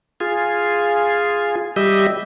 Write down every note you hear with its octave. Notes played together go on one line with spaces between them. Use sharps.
F4 G#4
G3 G4 D#5 E5